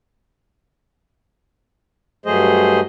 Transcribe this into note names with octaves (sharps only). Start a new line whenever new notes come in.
G2 F#3 A3 G#4 C5 D#5